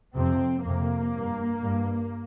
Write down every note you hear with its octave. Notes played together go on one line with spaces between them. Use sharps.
F2 C3 C4
F2 C3 A#3
G2
G2